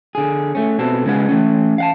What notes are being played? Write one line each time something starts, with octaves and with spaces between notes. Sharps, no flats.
D3 G#4
A3 C#4
B2 B3 C4 A4
C#3 G#3 G#4 B4 F#5
E3 A3 C#4
F5 F#5 A5